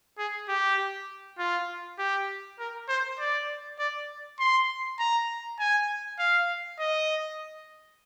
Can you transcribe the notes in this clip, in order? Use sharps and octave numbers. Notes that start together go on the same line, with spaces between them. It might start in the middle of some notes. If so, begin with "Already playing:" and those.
G#4
G4
F4
G4
A#4
C5
D5
D5
C6
A#5
G#5
F5
D#5